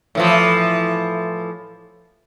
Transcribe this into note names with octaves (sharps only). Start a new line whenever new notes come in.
A2 E3 F3